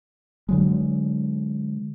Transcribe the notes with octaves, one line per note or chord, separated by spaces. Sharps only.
D3 F#3 G#3